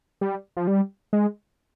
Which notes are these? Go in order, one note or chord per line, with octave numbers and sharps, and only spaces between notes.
G3
F3
G3
G#3